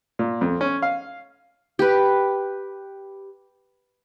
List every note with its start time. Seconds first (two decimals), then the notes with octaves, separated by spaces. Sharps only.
0.19 A#2
0.41 F2
0.61 C#4
0.82 F5
1.79 G4 B4